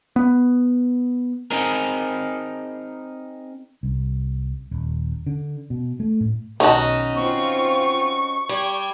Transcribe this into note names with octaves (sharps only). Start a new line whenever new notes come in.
B3
C4 D#4 G#4 A#4
C2
D#1
D3
B2
A3
A2
B1 B2 D#3 C#4 D#4 F#4 A5
C4 F4 C#6
G3 G5 G#6